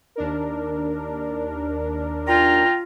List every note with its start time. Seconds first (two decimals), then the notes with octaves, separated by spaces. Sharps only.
0.16 D#2 D4 A#4
2.28 F4 G5 A#5